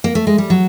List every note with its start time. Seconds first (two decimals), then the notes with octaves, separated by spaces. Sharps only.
0.04 A#3
0.15 A3
0.27 G#3
0.38 G3
0.50 F#3